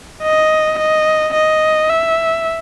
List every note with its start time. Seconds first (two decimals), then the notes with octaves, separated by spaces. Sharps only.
0.23 D#5
0.78 D#5
1.34 D#5
1.90 E5